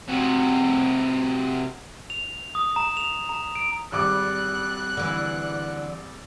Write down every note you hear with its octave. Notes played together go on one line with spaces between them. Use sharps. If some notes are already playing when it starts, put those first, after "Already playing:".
C3 F#4
F7
D#6
A#5
F7
A#5
D7
G#1 G3 D6 F#6
D3 E3